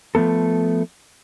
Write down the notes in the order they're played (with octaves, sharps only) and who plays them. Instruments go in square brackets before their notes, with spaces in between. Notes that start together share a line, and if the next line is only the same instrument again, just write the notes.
[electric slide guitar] F3 A3 B3 A4